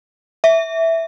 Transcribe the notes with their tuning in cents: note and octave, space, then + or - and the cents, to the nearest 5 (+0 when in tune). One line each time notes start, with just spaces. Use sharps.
E5 -5